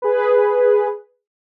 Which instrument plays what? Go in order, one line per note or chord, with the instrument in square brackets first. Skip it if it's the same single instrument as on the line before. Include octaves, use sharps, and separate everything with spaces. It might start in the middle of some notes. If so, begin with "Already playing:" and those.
[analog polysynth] G#4 B4